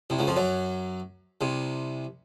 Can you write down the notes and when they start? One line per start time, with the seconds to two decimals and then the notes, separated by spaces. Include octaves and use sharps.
0.10 C2 C3
0.19 C#2 C#3
0.27 F2 F3
0.36 F#2 F#3
1.41 C2 C3